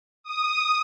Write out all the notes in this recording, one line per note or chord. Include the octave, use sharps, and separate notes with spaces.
D#6